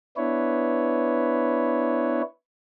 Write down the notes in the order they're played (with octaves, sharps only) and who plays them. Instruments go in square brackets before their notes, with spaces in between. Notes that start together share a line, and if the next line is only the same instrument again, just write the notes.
[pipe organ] B3 D4 E4 B4 C#5